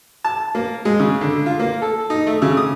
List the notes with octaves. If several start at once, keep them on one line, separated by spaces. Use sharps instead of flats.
A5
A#3
G#3
C#3
D3
F4
A#3
A4
D#4
A3
C#3
D#6